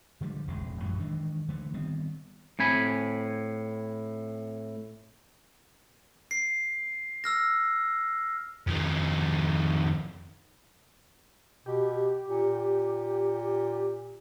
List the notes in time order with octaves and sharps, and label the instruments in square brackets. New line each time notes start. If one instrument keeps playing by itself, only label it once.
[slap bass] D3 F3 G3 G#3
E1 A1 F2 G#3
F#2 A2 E3
D#3 E3 G#3 D4
D3 E3 F#3 A3
D#3 G3 B3 C4
[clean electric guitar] A2 C4 G#5 B5
[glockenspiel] C7
E6 F6 A#6
[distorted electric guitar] F2 D#3
[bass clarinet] B2 [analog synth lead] G4
[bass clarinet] A#2